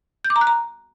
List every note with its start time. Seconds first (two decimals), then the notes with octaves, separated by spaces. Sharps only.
0.24 G6
0.30 D6
0.36 A#5
0.41 F#6
0.47 A#5